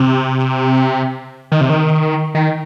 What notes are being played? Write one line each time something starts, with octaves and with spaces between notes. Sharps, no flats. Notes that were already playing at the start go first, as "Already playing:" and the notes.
Already playing: C3
D#3
C3
D#3
D#3